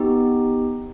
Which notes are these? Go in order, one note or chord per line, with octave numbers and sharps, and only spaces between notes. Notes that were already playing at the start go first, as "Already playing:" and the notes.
Already playing: B3 D#4 G4